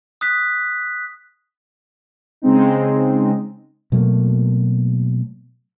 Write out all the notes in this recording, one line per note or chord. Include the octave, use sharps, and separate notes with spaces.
D#6 F#6 B6
C#3 G#3 C4 D#4
B2 F#3 A3 A#3